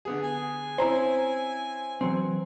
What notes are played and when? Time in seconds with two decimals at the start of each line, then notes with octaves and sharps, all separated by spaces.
0.05 D3 B3 G#4
0.23 G#5
0.78 C4 C#4 E4 C5 A#5
2.01 E3 F#3 C4